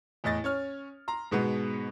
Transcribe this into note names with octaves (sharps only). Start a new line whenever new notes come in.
E2 A2 D#5 A6
C#4 C#5 F6
A#5 C6
G#2 B2 G#3 B3